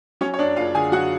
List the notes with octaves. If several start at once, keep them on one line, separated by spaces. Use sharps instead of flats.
F#3 C#4 C#5
C#5
F#2 D4 D5
F#1 F4 F5
D3 G#4 G#5
F#3 F#4 F#5